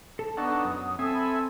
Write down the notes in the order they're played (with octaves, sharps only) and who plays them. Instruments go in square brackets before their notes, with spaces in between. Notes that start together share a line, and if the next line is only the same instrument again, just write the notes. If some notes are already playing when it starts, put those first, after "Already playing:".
[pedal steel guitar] A4 [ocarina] A5
[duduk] B3 [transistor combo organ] D4 D#4 A4 [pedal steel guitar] F#5 F#6 [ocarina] C#6
[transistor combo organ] F#2 [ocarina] D#6
[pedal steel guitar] C4 [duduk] A4 [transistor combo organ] E5 G#5
[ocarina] B5